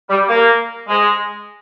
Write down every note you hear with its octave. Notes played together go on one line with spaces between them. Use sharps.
G3
A#3
G#3